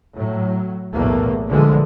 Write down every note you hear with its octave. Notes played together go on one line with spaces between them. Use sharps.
A2 F#3
B1 E2 A2 A3 A#3
A#1 D3 E3 F3 G#3